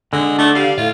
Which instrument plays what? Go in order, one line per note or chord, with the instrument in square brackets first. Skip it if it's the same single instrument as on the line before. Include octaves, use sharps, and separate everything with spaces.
[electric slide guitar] D3 [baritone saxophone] G#3
[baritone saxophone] A3 [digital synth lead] D4
[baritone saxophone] G3 [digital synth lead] F5
[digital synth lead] A2 [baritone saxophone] F4